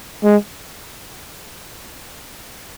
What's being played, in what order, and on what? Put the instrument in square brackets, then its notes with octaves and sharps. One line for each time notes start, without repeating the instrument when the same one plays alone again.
[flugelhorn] G#3